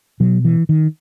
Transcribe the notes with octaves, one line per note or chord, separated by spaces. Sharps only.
B2 F#3
E3
D#3